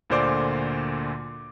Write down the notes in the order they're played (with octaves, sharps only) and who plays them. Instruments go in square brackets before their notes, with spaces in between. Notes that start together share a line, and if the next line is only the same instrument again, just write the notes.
[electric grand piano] D2 A#2 D3 C5 D5 D6